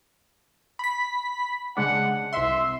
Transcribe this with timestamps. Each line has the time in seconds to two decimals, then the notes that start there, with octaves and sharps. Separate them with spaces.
0.79 B5 B6
1.77 C#3 G#3 D4 F#5
2.33 C2 E5 C6